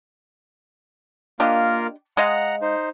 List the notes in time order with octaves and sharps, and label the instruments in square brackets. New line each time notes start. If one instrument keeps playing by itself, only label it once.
[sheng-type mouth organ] A#3 F4 A#4 [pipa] D4 G4 D#5
[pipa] G#3 D#5 F5 [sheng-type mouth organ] F#5 A#5
[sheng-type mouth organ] D#4 C5